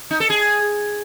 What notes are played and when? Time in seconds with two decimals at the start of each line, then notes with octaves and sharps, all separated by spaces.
0.11 D#4
0.20 A4
0.30 G#4